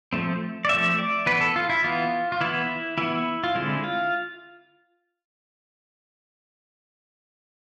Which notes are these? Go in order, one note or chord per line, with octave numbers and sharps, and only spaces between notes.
F3 A3 C4
D5
F3 A3 C4 E5
D5
E3 B3 B4
A4
F4
E4
E3 B3 F4
F4
E3 B3 E4
E3 B3 E4
F4
D3 G#3 C4 E4
F4